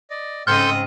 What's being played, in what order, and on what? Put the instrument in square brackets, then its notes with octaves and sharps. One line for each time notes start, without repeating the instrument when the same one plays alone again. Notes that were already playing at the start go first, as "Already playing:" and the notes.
[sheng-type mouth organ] D5 D#5
[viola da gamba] G#2 C#3 D#5 [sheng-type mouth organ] C4 [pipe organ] A4 C6 G6 [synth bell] F6